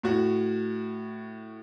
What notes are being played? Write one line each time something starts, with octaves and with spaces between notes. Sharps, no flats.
A2 F#4